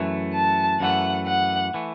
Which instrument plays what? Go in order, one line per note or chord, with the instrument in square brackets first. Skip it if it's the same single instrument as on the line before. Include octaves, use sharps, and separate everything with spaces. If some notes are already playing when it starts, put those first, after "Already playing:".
Already playing: [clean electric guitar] F#2 E3 A3
[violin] A5
[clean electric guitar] F#2 E3 A3 [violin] F#5
[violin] F#5
[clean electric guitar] E3 A3